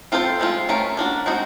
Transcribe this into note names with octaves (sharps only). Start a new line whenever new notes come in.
C4 F4 A4 C5
F3 G#3 C4 F4
A3 C#4 F4 A#4
A#3 D4 F#4
G#3 C4 D#4 F#4